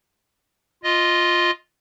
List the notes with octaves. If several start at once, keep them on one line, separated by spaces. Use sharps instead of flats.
F4 D#5